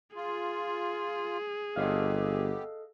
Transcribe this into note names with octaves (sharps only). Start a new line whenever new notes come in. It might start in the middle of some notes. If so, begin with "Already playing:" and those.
F4 G#4
G1 B3 G4 A4 D#5 F5